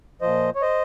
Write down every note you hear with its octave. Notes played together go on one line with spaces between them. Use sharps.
A#2 F3 C5 D#5
C#5
C5 D#5